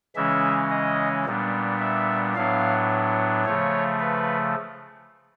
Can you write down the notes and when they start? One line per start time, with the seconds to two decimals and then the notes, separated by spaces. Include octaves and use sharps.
0.15 C#3 E3 G#3 C#4 E5
0.70 D#5
1.25 A#2 G3 B3 D4
1.80 E5
2.35 A2 F#3 B3 D4 F5
3.45 C#3 F3 A3 C#5
4.00 B4